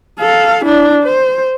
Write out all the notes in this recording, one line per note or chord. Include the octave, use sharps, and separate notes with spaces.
A4 F5
D4 E4
C5